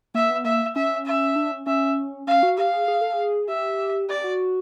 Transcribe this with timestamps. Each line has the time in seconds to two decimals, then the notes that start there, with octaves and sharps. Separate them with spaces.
0.14 A#3 E5
0.30 B3
0.45 A#3 E5
0.75 C#4 E5
1.06 E5
1.36 D4
1.52 C#4
1.66 C#4 E5
2.27 C#4 F5
2.43 F#4
2.57 G4 F5
2.73 G#4
2.88 G#4
3.01 A4
3.13 G#4
3.48 G4 E5
4.09 G4 D5
4.24 F#4